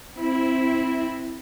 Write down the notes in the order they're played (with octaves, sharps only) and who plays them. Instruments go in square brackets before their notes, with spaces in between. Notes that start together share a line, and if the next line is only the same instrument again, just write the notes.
[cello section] C4 E4